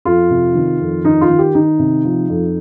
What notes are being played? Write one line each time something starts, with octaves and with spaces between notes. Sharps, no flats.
F2 F4
C3
D#3
F2
D#3 D#4
F4
D#3
G4
D#3 D#4
C3
F3
F2